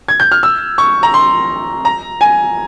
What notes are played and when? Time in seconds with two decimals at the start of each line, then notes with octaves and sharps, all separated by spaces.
0.08 G#6
0.20 G6
0.32 F6
0.43 E6
0.78 C#6
1.03 A#5
1.14 C6
1.85 A#5
2.21 G#5